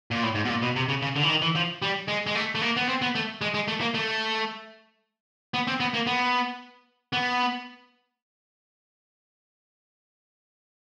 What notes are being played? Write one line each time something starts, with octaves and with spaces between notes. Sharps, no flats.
A#2
A2
G#2
B2
A#2
B2
C3
C#3
C#3
D3
E3
D#3
E3
F3
G3
G#3
G#3
A3
A3
A#3
B3
C4
B3
A3
G#3
G#3
A3
A#3
A3
B3
C4
B3
A#3
B3
B3